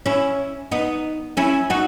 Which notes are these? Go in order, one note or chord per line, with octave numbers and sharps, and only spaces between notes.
C#4 E4
B3 D#4
C#4 E4
D#4 F#4